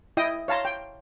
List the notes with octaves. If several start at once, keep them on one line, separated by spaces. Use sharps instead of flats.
E4 D#5 G5 D#6
C#5 F5 A5 A#5 C6
G5